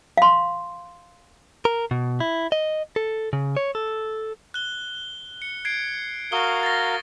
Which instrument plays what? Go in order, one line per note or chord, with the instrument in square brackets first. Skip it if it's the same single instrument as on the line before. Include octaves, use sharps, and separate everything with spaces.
[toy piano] F5 C6
[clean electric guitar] A#4
B2
E4
D#5
A4
C#3
C#5
A4
[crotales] F#6 G7
C#7
G#6 C7 D7
[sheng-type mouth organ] F#4 A#4 F5 [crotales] C#6 D#6 G7
[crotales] A6 A#6